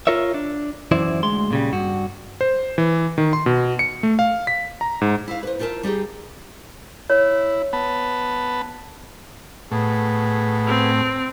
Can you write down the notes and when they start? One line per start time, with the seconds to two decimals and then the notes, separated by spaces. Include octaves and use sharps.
0.07 F4 A#4 C#5 E5
0.34 D4
0.92 F#2 E3 E4 C5 D5
1.23 D2 G#3 C6
1.51 A#2 C#3 G3
1.73 G2 F#4
2.41 C5
2.78 E3
3.18 D#3
3.33 C6
3.46 B2
3.79 C#7
4.03 A3
4.19 F5
4.47 B6
4.81 A#5
5.01 G#2
5.28 E4 F5
5.43 B4 C5
5.59 D#4 F4 A#4 E5 A5
5.83 G3 D#4 G4 G#4
7.10 E4 C#5
7.73 B3 A5 B5
9.71 A2 B3 G#4
10.67 C4